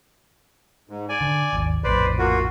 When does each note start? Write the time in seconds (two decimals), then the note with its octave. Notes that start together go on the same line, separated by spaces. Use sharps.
0.89 G#2
1.09 D5 G#5
1.21 D3
1.53 G#1 D#2
1.84 A#1 F2 A2 B4 C5 D5
2.19 A#3 F4 F#4